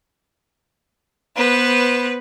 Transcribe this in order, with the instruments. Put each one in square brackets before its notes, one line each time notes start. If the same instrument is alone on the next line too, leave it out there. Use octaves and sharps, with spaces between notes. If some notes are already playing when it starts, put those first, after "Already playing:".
[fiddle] B3 C5 [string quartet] B4